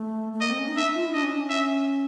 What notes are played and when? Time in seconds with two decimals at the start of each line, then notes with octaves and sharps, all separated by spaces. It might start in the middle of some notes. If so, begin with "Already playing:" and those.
Already playing: A3
0.33 A3
0.41 A#3 D#5
0.50 C4
0.59 C#4
0.68 D#4
0.76 D4 E5
0.86 D#4
0.95 F4
1.05 E4
1.13 D4 D#5
1.23 C#4
1.32 D4
1.41 C#4
1.49 E5